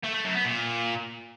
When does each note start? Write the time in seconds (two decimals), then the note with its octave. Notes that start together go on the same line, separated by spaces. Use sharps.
0.03 A3
0.14 A3
0.24 F#2
0.35 B3
0.45 A#2